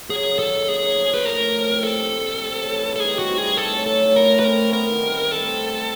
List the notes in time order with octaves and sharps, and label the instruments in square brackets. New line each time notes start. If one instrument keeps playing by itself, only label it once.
[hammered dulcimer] F#3 [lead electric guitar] G#4
[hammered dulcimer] F#2
[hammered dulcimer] D#3 [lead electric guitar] A4
[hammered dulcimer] F#2
[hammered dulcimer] A#3 [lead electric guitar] G#4
[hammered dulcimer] C#4
F3
[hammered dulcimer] A2 [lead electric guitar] B4
[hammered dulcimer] A3 [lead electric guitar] A#4
[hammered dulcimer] C#4
F3
C3
[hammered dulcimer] A#3 [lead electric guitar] A4
[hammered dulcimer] D4
F3
C3
A3
C#4
E3
G2
[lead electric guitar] A4
[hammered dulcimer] D#4 [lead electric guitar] G#4
[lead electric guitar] F#4 [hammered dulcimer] G4
[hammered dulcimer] C4
[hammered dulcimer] G3 [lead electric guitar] G#4
[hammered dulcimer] A3 [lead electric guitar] A4
[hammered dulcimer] C#4
[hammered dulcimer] F#3 [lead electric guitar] A4
[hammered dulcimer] A2
[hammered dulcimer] E4 [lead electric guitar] A#4
[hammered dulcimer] A3
[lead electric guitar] B4
[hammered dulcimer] C4 [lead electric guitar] A#4
[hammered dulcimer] A3
[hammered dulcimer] B3 [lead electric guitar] A#4
[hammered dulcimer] D#3
G3
D#3
[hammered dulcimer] A3 [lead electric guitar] A4
[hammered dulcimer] C4